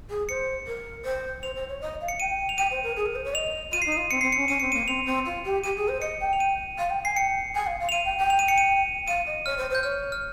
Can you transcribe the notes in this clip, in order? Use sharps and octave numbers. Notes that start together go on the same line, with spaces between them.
G#4
C5 C#7
A#4
C5
C5 F7
C5
C#5
D#5
F5
C#7
G5 D#7
F7
G5 D#7
C5
A#4
G#4
A#4
C5
C#5
D#5 F7
F4 D#7
C7
D#4
D#7
F4
C4 C#7
C4 C7
C#7
C#4
C#4 D#7
C4 C#7
A#3 D#7
C4 F7
C4
F4
G4
G4 D#7
G#4
C5
D#5 C#7
G5
F7
D#7
F5
G5
G#5 C7
G5 C#7
G#5
F5
F5
F7
F5 D#7
G5
G5
F7
D#7
C#7
D#7
F5 D#7
D#5
C#5 F6
C5
C5
G6
C#5 F6
F6